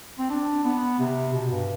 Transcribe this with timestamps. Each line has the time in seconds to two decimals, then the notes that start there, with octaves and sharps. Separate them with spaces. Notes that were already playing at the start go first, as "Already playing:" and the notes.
0.19 C4
0.30 D4
0.64 B3
1.00 C3
1.33 B2
1.51 G2